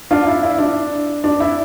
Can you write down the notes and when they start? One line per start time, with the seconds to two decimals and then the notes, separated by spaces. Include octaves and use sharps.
0.11 D4 F4
0.27 E4
0.43 E4
0.58 D4
1.24 D4
1.40 E4